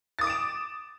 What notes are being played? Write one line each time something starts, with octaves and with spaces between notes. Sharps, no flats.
D6 D#6 A6 D7 E7